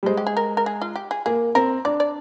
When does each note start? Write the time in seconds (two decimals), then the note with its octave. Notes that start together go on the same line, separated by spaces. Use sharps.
0.03 G3
0.06 G#3 C5
0.17 G4
0.27 G#4
0.37 A#4
0.57 A#4
0.66 G#4
0.81 F4
0.96 G4
1.11 G#4
1.26 A#3 G#4
1.55 C4 A#4
1.85 D4 D5
2.00 D5